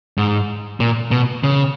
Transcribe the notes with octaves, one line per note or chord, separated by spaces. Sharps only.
G#2
A#2
B2
C#3